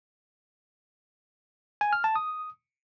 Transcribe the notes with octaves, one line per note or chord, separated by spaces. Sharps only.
G#5
F6
A5
D#6